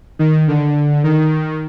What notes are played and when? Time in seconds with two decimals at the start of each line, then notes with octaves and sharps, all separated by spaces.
0.19 D#3
0.48 D3
1.04 D#3